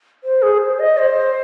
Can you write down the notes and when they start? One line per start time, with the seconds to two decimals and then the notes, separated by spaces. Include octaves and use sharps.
0.24 C5
0.42 G#4
0.61 C5
0.79 D#5
0.98 C5